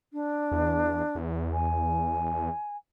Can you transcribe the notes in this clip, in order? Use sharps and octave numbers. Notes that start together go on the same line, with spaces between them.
D4
E2
E2
G#5